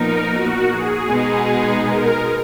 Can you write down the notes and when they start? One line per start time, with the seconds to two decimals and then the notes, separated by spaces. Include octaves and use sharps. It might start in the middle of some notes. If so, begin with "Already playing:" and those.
Already playing: A#2 F3 B3 D#4 A#4
0.31 F#4
0.69 G#4
1.08 B2 G#3 B3 D#4
1.85 A#4